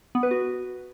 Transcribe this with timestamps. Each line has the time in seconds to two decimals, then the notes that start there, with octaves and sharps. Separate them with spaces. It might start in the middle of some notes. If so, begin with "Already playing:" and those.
0.15 B3
0.23 B4
0.31 F#4